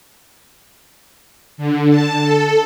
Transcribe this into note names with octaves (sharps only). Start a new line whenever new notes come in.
D3
A5
A4